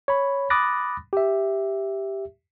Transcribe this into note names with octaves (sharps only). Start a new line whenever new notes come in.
C#5 B5
B5 D6 D#6 F#6 A6 A#6
G4 E5